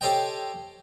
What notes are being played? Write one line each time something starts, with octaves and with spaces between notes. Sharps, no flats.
G4 A4 C5 C#5 D#5 G5